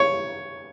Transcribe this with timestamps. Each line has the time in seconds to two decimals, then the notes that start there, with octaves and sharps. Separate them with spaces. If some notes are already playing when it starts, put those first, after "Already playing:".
Already playing: C#5